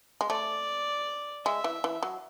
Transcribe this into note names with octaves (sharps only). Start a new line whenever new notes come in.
G#3
A3 D5
G#3 E5
E3
E3
F#3